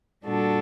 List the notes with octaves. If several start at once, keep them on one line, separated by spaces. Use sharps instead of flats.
A#2 G3 D4 F#4 A4